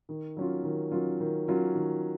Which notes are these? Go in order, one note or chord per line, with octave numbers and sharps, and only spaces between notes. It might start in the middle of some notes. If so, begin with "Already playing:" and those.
D#3
F#3 C#4 F4
D#3
F#3 C#4 F4
D#3
F#3 C#4 F4
D#3